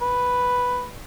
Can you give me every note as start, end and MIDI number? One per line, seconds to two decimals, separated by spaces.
0.01 0.87 71